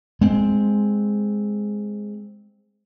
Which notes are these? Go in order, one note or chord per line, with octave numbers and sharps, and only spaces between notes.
G#3 C4